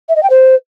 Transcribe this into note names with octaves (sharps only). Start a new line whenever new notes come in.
E5
D#5
G5
C5